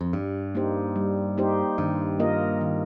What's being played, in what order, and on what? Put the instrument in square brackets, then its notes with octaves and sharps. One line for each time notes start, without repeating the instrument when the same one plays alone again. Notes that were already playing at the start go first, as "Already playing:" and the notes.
[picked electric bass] F2
[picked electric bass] G2 [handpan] G3
[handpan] A#3 D#4 G4 C5
G3
A#3 D#4 G4 C5
[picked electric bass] G2 [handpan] D#3
[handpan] A#3 F4 A#4 D#5
D#3